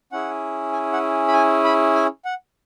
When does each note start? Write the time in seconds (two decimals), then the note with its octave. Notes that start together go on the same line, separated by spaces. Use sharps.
0.12 C#4 E4 G#4 F#5
0.73 G#5
0.93 F#5
1.28 B5
1.33 G#5
1.64 B5
1.95 G#5
2.25 F#5